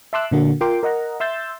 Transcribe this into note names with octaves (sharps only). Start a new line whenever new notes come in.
E5 A5 C6 D6 E6 F#6
A#2 D3 A#3 F#4
F4 A#4 G5 C6 D6
A#4 D#5 F#5 A#5
E5 C6 E6 G6 A6